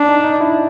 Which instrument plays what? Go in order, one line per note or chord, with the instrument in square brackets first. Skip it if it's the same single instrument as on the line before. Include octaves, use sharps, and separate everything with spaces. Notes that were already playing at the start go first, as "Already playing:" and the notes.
Already playing: [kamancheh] D4
[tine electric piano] D#4
D#4
E4